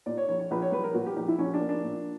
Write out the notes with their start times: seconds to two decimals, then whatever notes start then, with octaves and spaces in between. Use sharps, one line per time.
0.06 A#2 D5
0.18 C#5
0.29 A#1 C#5
0.40 C#5
0.51 A#1 B4
0.62 C#5
0.72 G3 B4
0.84 A#4
0.94 A#2 F#4
1.06 G4
1.16 A#1 G4
1.28 E4
1.39 A#1 C#4
1.54 D4
1.60 A#3
1.69 D4
1.83 A#2